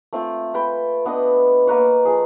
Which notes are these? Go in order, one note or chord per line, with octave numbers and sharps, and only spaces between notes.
A3 C4 F4
B4 G5 B5
B3 D4 D#5
A#3 A#4 B4 C#5
F3 G#4